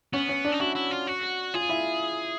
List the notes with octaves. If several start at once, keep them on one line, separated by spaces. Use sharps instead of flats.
B3 C#4 C#5
C#4 C#5
D4 D5
D#4
E4 F#4 F#5
E4
F4
F#4
F4 G#4 F5
E4 E5